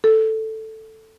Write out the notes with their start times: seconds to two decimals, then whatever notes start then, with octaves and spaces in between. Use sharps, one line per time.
0.04 A4